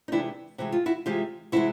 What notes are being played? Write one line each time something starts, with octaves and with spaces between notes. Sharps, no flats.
D#4
C3 E3 G#3 D4 E4
C3 E3 G#3 F#4
F4
E4 F#4
C3 E3 G#3 F4 G4
C3 E3 G#3 E4 F#4